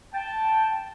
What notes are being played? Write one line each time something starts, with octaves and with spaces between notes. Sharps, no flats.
G5 A5